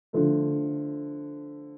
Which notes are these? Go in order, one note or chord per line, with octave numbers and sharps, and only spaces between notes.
D3 F3 A3